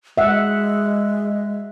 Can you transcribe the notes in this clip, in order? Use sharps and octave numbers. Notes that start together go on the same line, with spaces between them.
G#3 E5 F#5